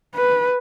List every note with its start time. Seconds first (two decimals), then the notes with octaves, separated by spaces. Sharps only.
0.15 B4